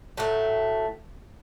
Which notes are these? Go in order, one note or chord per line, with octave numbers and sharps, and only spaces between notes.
A2 F#3 A3